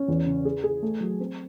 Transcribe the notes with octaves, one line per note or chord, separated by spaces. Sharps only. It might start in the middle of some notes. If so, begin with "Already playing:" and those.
Already playing: C#4
E2
C#3
G#4
G#4
A3
F#3
C4